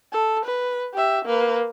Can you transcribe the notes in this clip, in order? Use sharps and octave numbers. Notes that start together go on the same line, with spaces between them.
A4
B4
G4 E5
A#3 B4